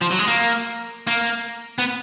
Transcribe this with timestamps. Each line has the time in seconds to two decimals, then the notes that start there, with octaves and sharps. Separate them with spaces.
0.01 F3
0.11 F#3
0.19 G#3
0.28 A#3
1.07 A#3
1.78 B3